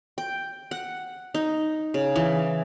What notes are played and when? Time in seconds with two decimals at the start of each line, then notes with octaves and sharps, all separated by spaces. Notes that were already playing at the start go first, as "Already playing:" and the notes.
0.18 G5
0.71 F#5
1.34 D#4
1.94 C#3
2.16 E3